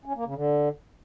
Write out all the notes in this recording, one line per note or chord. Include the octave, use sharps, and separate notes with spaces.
C#4
A#3
C#3
D3